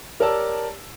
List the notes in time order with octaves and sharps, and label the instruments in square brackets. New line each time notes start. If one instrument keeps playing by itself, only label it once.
[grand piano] G4 A#4 C#5 D5 A5 E6